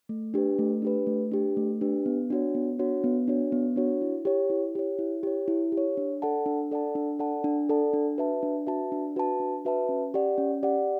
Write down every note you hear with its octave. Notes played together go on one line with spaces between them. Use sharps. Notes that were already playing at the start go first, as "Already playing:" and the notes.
A3
D4 G4 B4
A3
D4 G4 B4
A3
D4 G4 B4
A3
D4 G4 B4
B3
D4 F#4 C#5
B3
D4 F#4 C#5
B3
D4 F#4 C#5
B3
D4 F#4 C#5
E4
G4 C#5
E4
G4 C#5
E4
G4 C#5
E4
G4
C#5
D4
A4 D5 F#5 A5
D4
A4 D5 F#5 A5
D4
A4 D5 F#5 A5
D4
A4 D5 F#5 A5
D4
F#4 B4 E5 A5
D4
F#4 B4 E5 A5
D4
F#4 B4 E5 A5
D4
F#4 B4 E5 A5
C#4
G4 D5 F#5
C#4
G4 D5 F#5